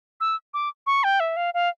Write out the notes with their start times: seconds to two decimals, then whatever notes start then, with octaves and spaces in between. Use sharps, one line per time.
0.21 E6
0.54 D6
0.87 C#6
1.04 G5
1.20 E5
1.37 F5
1.54 F5